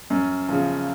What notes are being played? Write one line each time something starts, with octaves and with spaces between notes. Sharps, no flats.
F#2
C#3 F3